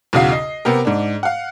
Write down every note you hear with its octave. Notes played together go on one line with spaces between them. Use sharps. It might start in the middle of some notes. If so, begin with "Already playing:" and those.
B1 E2 C#3 F#4 F5 C7
D#5
C3 B3 G4 A#4
G#2 D4
F5 F#5